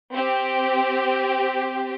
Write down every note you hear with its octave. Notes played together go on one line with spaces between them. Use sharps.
C4 G4